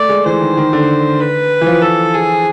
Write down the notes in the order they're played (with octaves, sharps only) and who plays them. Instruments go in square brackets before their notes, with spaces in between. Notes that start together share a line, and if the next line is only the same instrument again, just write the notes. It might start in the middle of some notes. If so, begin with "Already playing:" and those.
Already playing: [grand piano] A3 [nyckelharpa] D5
[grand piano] G#3
[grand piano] E3 [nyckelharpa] C5
[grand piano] D#3
D#3
D3
[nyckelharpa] B4
[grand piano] E3
F3
[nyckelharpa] A4
G#4